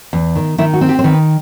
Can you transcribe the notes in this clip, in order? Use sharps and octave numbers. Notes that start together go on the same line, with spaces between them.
E2
D#3
D#3 E4
F#4
C4
G4
C5
D#3 B4